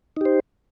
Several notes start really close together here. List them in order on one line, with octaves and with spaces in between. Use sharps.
D#4 G4 C5